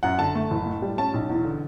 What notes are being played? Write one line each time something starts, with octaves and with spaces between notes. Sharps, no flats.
F#2 F#5
D3 A5
A3
F#1
A2
G3
C#4 A5
B1
E2
D3